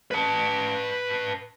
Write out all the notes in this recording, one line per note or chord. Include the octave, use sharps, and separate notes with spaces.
B4 A5